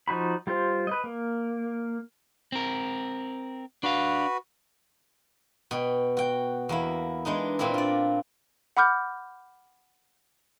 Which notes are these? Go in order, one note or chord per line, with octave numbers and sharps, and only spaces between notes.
F3 D#4 F#4 B5
G3 F4 C5
B4 D#5
A#3
C4 A#4
D4 F#4 B4 F5
B2 G5
F#4 G5
E2 A#3 E4
E3 G#3 D4 D#4
A#2 A#3 C4 D4 E4
F4 D5
F#5 B5 D6 F6 G6